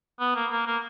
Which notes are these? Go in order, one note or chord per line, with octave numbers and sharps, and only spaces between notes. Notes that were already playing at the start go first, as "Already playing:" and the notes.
B3
A#3
A#3
A#3